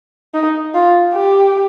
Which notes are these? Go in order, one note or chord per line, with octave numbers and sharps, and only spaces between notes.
D#4
F4
G4